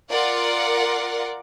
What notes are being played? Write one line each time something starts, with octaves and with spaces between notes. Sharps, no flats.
F4 A#4 D5 F#5